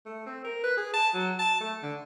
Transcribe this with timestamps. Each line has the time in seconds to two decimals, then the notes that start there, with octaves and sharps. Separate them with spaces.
0.06 A3
0.26 C4
0.44 A#4
0.64 B4
0.77 G#4
0.93 A5
1.14 F#3
1.39 A5
1.60 A3
1.82 D3